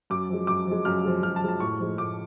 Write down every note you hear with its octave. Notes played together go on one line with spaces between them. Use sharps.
F#2 D6
F3 G#3
F#2 D6
F3 G#3
F#2 F6
F3 G#3
F#2 F6
A5
F3 G#3
A5
A2 C#6
F3 G#3
A2 D6